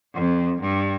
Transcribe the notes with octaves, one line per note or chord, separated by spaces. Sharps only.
F2
G2